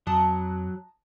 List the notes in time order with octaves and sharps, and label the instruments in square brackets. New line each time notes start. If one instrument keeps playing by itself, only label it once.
[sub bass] F2 [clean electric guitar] F#3 [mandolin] A5 A#5 D#6